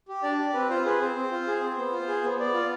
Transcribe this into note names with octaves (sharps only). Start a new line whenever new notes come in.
G4
D4 D5
G4
C4 B4
F4 C5
G#4 B4
C4 C5
C4
F4
G#4
C4
B3
F4
G#4
B3
B3 D5
F4